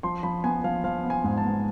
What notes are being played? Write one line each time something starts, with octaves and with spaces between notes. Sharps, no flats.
F3 C6
F3 B5
B3 G#5
F3 F5
F3 F5
B3
G#5
G#2
A5
B3